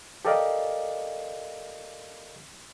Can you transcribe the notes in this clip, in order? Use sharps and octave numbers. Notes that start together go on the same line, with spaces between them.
G4 A4 A#4 D5 D#5 F5